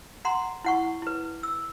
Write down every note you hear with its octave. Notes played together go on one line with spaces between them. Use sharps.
F#5 A#5 C6
E4 F#5 C#6
E4 B4
E6